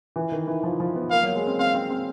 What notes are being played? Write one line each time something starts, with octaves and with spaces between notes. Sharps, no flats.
E3
D#3
E3
F3
F3
B3
A#3 F5
F#3
G#3
C4
C4 F5
C4
C4